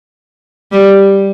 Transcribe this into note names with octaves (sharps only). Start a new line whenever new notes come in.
G3